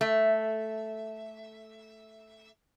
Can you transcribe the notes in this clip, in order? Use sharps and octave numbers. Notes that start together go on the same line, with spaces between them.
A3 E5